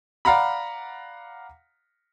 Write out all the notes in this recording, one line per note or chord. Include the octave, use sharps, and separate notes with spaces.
D5 F5 F#5 A#5 B5